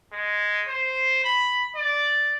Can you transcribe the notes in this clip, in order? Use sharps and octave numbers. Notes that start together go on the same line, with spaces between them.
G#3
C5
B5
D5